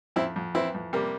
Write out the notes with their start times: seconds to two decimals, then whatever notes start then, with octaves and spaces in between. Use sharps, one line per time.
0.16 F2 C4 E4
0.36 F2
0.54 E3 C4 E4
0.75 F2
0.93 C3 G3 A#3